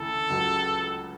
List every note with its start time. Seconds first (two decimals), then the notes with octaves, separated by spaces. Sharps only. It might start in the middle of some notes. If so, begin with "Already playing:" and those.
Already playing: D2 C#3 E3 A4
0.29 C#2 C#3 F#3